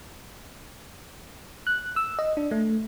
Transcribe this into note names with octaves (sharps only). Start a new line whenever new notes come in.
F#6
E6
D#5
D4
A3